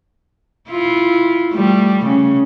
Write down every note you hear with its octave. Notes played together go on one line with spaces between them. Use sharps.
E4 F4
G3 A3
C#3